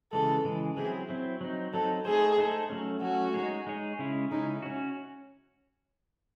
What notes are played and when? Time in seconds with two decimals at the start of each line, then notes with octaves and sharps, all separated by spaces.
0.12 C#3 E3 G#3 A4
0.44 C#3 E3 G#3
0.77 F#3 C4 E4 G#4
1.09 F#3 C4 E4
1.41 F#3 C4 D#4
1.73 F#3 C4 D#4 A4
2.05 A3 D#4 G#4 A4 C5
2.38 A3 D#4 A4 C5
2.70 F#3 A3 C#4
3.02 F#3 A3 C#4 F#4
3.34 G#3 D#4 G#4 C#5
3.67 G#3 D#4 G#4 C#5
3.99 C#3 G#3 C#4 E4
4.31 C#3 G#3 C#4 D#4 E4
4.62 C#4 F#4